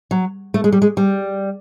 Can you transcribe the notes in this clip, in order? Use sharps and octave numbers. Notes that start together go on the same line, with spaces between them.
F#3
A3
G#3
G3
G#3
G3